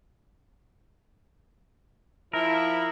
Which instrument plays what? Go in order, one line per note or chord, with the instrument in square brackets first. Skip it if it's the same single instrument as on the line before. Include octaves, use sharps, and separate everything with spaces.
[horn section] F3 E4 [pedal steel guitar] A#4